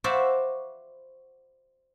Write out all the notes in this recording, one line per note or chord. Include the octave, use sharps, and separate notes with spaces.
F#4 C5 D5 E5 F5 B5